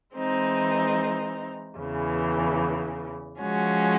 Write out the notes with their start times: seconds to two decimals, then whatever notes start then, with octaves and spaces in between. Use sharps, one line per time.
0.15 E3 G#3 C4 D#4
1.78 E2 C#3 E3
3.40 F3 G#3 C#4 F#4